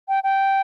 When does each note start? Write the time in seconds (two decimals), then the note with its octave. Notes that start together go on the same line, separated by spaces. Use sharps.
0.08 G5
0.24 G5